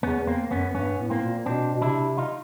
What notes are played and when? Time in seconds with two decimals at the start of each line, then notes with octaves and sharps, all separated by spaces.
0.03 E2 B3 C#4
0.27 A#3 C4
0.51 F#2 B3 C#4
0.75 G2 B3 C#4
0.98 A2
1.10 A#3 C4
1.23 A#2
1.46 B2 C4 D4
1.75 B2
1.81 C3 D4 E4
2.18 D#4 F4